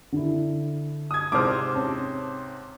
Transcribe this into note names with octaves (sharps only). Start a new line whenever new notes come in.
D3 E4
D#6 G#6
G#2 C3 C5 A5 D6 E6 F6
C4 C#4 A5